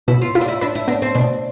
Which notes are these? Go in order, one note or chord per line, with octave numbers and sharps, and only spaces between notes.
B2 E4
F4
E4 F4
D4
E4
D4 B4
E4
B3 D4
C4
B2 D4